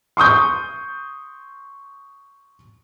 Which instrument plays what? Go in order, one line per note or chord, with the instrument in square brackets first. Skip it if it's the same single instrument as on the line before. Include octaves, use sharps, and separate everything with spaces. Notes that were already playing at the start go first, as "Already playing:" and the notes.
[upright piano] C6 C#6 D#6 G6